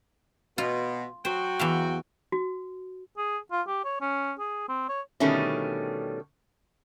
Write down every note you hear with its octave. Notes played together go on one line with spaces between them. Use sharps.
B2 F4
F#3 F#4 C5 G5
E2 E5 F5
F#4
G#4
F4
G4
C#5
C#4
G#4
C4
C#5
B2 D3 D#3 G3 A3 C#4